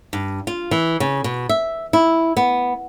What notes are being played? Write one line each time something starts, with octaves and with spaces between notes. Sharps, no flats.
G2
F4
E3
C#3
B2
E5
E4
B3